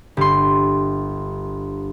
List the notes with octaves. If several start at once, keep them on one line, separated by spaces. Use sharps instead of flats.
G1 C6